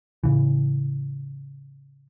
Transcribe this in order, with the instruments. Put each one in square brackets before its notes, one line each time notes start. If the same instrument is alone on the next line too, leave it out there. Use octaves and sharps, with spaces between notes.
[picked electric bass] A2 C#3 E3